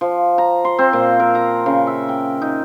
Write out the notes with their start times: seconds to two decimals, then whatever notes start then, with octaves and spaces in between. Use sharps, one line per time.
0.01 F3
0.38 A#5
0.65 C6
0.79 C4
0.93 A#2
1.20 A#4
1.35 A#5
1.66 C#3
1.87 E5
2.09 G5
2.42 D#4